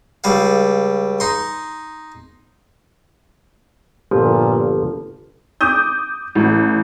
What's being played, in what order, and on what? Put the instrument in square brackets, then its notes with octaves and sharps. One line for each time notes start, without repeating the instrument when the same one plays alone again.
[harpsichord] C#2 G3 F5
D#4 C6
[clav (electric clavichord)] G1 F3 [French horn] A#2
[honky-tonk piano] D6 D#6 G6
A1